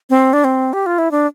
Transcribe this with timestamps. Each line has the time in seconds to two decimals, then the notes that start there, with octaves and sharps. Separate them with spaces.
0.10 C4
0.33 D4
0.44 C4
0.73 G4
0.86 F4
0.98 E4
1.11 D4